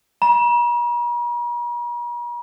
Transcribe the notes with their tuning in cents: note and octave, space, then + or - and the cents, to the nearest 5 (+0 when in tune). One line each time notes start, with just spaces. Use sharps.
A#5 +45